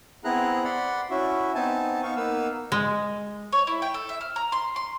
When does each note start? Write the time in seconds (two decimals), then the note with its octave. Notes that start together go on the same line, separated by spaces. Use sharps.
0.24 B3 C4 E4 G#4 A#5 F#6
0.64 D5 F#5 B5 C6
1.10 C#4 E4 F#4 E5
1.55 B3 C4 D#4 G#5 A5
2.03 B3 D#4 F5 C#6
2.16 A#3 B3 D#4 B4 F5 E6
2.72 G#3
3.53 C#5
3.67 E4
3.82 G5
3.94 A4
4.09 E5
4.21 F6
4.36 A#5
4.52 C6
4.76 C6